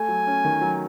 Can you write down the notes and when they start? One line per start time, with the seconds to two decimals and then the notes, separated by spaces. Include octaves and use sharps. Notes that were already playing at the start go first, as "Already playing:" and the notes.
Already playing: A3 G#5
0.09 F#3
0.27 C#4
0.45 D#3
0.61 F#3